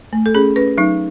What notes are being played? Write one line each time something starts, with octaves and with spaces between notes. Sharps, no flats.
A3
A4
C#4 G#4
C#4 B4
F#3 D#4